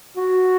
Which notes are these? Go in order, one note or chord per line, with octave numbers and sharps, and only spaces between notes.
F#4